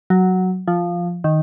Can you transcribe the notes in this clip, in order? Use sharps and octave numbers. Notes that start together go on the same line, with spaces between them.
F#3
F3
D#3